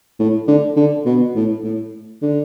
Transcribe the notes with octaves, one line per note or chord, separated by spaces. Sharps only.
A2
D3
D3
B2
A2
A2
D3